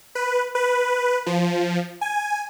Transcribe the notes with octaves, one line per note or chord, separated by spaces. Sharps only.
B4
B4
F3
G#5